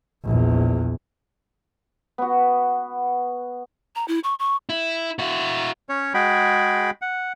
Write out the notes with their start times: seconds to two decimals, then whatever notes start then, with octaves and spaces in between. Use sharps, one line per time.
0.24 A#1 E2
2.18 B3 F#4
3.96 A#5
4.08 E4
4.24 C#6
4.39 C#6
4.69 E4
5.19 E4 F#4
5.89 C#4 C#5
6.14 G#3 F#4 G#4 G5 B5
7.02 F#5